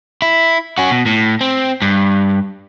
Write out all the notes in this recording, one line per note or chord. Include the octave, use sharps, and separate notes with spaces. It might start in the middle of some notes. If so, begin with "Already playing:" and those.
E4
C#4 F#4
B2
A2
C4
G2